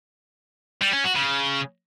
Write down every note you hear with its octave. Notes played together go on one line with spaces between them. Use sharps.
G3
C#4
F#4
C#3